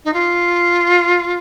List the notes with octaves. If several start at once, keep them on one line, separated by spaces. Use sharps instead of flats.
D#4
F4